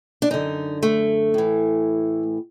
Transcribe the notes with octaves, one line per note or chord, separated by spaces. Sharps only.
D4
F#2 D3 D#4
A3
A2 E3